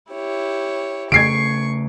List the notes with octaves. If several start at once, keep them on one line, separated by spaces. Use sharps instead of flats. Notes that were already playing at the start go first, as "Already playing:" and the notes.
E4 G4 C#5
C#3 A3 C#6 G#6 C7 D7